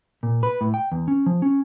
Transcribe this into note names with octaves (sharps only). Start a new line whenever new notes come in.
A#2
B4
A2
G5
E2
C#4
F3
C#4